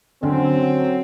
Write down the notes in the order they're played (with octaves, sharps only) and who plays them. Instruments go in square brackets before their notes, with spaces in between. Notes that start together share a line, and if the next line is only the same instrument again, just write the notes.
[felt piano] D3 C#4 [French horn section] F#3 C4